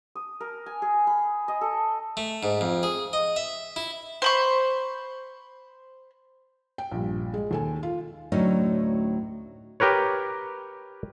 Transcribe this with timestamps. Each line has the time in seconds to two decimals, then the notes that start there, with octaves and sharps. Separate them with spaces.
0.15 D#6
0.40 A#4
0.66 G#5
0.82 G#4
1.07 B5
1.48 D#5
1.61 A4
2.17 A3
2.43 G#2
2.61 F2
2.83 G#4
3.13 D#5
3.36 E5
3.76 E4
4.22 C5 B5 C#6
6.78 G5
6.91 A#1 G2
7.34 G#3
7.51 D#2 A4 G#5
7.83 F4
8.32 D2 A2 F#3 C#4 D#4
9.80 G4 A#4 B4 C#5